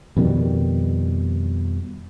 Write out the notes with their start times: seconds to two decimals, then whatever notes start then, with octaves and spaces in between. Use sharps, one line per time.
0.17 F2 B2 D#3 G3